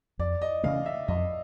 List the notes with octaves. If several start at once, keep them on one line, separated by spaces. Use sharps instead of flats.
F2 D5
D#5
C#3 E3 A3 F5
E5
F2 D#5